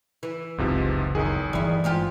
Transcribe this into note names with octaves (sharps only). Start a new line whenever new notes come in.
E3
F#1 C#2 G#2 C3 F3
B1 D#3 G#4
G1 E3 G3 E4
G#2 F4 G4